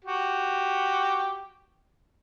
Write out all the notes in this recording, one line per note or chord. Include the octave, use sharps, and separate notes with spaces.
F#4 G4